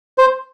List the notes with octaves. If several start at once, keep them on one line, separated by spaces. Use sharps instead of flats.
C5